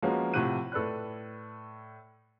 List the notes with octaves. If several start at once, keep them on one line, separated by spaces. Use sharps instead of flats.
F3 G#3 A#3 B3 C#4 F#4
A2 C3 F3 F#5 F#6 D#7
A2 A4 B4 D5 F#6